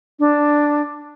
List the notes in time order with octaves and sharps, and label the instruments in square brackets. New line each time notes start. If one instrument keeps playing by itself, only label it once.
[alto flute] D4